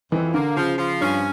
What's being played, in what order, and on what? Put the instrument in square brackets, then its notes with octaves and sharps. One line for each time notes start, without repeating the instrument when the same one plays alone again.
[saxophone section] F2 [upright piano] E3
[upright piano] D3 [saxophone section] A#3
[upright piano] C#3 [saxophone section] F3
[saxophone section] F3
[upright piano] G2 [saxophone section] C#4